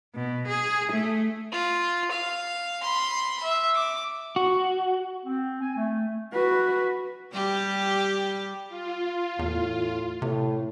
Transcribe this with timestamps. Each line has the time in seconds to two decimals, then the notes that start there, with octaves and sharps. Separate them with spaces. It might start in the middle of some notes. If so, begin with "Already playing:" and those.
0.15 B2
0.47 G#4
0.92 A3
1.52 F4
2.11 F5
2.82 B5 C6
3.43 E5
3.74 D6
4.36 F#4
5.26 C4
5.62 G#5
5.76 A3
6.33 F#4 B4
7.33 G3 G4
8.69 F4
9.39 E2 A2
10.22 A2 C3